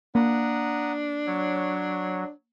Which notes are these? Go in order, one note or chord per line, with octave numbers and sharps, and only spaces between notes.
A#3 D4 F#5 A#5 D#6
F#3 C#5